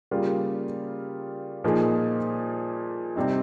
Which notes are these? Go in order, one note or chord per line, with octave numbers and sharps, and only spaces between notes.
C#3 G3 A#3 F4
A#2 F3 A#3 D#4 G#4
C3 G3 C4 D#4